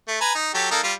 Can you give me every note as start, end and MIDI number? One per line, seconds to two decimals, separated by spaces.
0.08 0.21 57
0.21 0.34 71
0.21 0.34 80
0.21 0.34 82
0.35 0.50 63
0.54 0.68 54
0.54 0.68 67
0.54 0.68 69
0.71 0.80 58
0.71 0.80 63
0.71 0.80 69
0.84 0.93 55
0.84 0.93 65